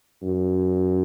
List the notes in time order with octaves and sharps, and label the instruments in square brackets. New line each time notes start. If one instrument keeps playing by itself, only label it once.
[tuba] F#2